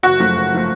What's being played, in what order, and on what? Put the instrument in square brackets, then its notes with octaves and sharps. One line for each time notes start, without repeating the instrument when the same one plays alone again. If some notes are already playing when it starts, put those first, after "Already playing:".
[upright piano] F#1 [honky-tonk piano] F#4
[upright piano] F#2 F3 A3
F#1
F3 A3